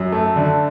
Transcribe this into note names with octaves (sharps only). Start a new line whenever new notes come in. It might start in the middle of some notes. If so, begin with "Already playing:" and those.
Already playing: F#2
A3
D3